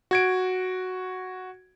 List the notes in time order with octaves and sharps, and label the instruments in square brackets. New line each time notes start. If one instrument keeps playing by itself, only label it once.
[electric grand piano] F#4 G#6 D7